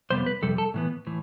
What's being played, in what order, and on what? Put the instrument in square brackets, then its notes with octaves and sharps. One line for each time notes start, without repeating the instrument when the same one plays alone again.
[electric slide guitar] F2 C3 G3 B3 C5
B4
F2 C3 G3 A4
A4
A2 E3 B3
A2 E3